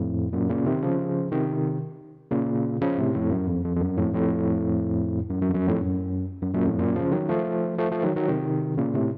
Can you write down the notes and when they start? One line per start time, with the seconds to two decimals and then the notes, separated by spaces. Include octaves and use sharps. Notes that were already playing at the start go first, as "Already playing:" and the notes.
Already playing: F2 A2
0.33 F#2 A#2
0.49 A#2 C#3
0.66 C3 D#3
0.83 C#3 F3
1.32 C3 D#3
2.31 A#2 C#3
2.81 C#3 F3
2.98 A2 C3
3.15 F2 A2
3.31 F#2
3.47 F2
3.64 F2
3.76 F2
3.81 F#2
3.97 F2 A2
4.14 F2 A2
5.30 F#2
5.42 F#2
5.49 F2
5.54 F#2
5.67 F2 A2
5.80 F#2
6.42 F#2
6.54 F#2 A#2
6.67 F2 A2
6.79 F#2 A#2
6.96 C#3 F3
7.12 D#3 F#3
7.29 F3 A3
7.78 F3 A3
7.91 F3 A3
8.03 D#3 F#3
8.16 D#3 F#3
8.28 C3 D#3
8.78 A#2 C#3
8.94 A2 C3